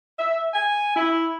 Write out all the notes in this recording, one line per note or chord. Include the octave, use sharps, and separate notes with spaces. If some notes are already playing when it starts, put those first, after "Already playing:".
E5
G#5
E4